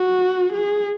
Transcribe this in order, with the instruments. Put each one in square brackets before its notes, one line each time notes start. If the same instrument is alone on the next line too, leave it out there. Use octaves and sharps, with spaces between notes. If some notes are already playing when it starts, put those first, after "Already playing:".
Already playing: [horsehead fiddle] F#4
G#4